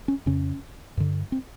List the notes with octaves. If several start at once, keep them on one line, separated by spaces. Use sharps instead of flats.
C#4
F2 C#3 C#4
G2 D3
C4